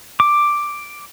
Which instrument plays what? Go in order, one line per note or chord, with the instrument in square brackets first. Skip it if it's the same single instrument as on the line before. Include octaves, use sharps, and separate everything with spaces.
[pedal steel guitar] D6